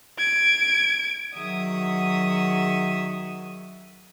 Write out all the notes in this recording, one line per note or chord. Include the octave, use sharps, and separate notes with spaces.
G#6 D7
D#3 F#3 F#4 G#4 E5 D#6